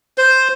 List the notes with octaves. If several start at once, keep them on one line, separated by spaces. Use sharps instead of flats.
C5